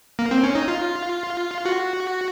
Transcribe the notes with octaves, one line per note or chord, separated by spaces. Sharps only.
A#3
C4
C#4
D#4
F4
F#4